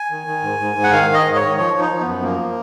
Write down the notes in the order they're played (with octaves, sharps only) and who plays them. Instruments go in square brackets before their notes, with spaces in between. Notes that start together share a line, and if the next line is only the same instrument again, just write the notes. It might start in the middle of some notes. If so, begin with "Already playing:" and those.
Already playing: [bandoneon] G#5
D#3
D#3
G#2
G#2
G#2
F#5
D#3 F5
D#3
D#5
G#2
C#5
D#3
F3 C#5
F3
D#4
F3
B3
F#2
F3 A#3